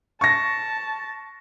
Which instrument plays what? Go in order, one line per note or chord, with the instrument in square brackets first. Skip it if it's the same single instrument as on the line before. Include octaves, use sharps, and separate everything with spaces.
[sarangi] A5 [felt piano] C#6 A#6